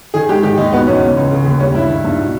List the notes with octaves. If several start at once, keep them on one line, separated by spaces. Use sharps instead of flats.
D#3 G#4
G#2 G4
D#3 G4
D#2 D#4
B2 B3
E2 C#4
C#3
C#2
C#3
D#2
G3 C#4
G2 E4
D#3
G2
B2